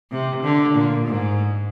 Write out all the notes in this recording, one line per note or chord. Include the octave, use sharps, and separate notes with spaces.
C3
D3
A#2
G#2